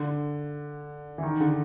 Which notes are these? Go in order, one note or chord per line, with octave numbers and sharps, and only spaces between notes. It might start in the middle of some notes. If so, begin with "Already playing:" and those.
Already playing: D3
E3
D#3
D3